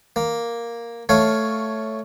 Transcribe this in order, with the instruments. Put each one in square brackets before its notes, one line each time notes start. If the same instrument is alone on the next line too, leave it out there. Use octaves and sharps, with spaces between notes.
[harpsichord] A#3
A3 C#5 F5